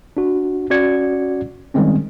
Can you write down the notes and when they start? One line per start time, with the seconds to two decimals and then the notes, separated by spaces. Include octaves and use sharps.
0.17 D4 F#4
0.70 C#4 F#4 D5 G#6 C#7
1.74 D#3 G3 G#3 C4 C#4